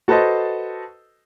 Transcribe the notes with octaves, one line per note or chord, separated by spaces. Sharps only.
F#4 A4 B4 C5 D#5 A5